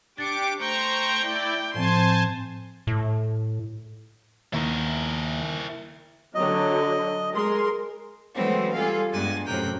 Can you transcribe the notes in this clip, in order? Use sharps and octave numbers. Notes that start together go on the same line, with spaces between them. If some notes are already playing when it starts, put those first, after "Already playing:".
D4 G4 D6 A6 C#7
A3 C5 G5 A#5 C#6
E4 D5
A2 F3 C4 C5 G#5 A5 C6
A2
D#2 E4 A#4
D3 F#3 D#5
G#3 A#4 C6
E3 F#3 G#3 A3 B3 C4
G3 F4 G#4 A4 F5
G2 G#3 B3 G#5 F#6 A6
F#2 A2 C3 A#4 G5 F#6